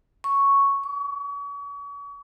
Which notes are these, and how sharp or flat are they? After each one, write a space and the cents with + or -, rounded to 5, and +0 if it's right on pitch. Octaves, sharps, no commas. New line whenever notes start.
C#6 +0
C#6 +40